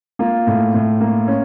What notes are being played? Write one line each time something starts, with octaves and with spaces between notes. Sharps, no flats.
A#3 F4
A2
A2
A#3
C#4